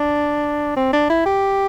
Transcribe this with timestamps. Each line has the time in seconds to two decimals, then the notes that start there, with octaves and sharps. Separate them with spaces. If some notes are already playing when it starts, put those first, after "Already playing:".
Already playing: D4
0.76 C4
0.93 D4
1.10 E4
1.26 G4